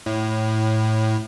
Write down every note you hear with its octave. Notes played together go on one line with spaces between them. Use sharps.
A2